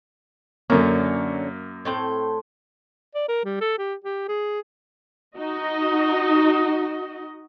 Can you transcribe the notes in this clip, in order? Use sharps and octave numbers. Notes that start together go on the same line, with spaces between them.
F#2 D3 A#3 C#4
A2 C4 G5
D5
A#4
G3
A4
G4
G4
G#4
D#4 F#4 D#5